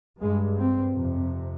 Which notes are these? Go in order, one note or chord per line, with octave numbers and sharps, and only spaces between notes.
G2 G#3
C4
F2 C3